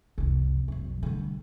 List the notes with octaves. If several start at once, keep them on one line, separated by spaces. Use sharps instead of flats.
C2 F2
B1 F2
D3 G3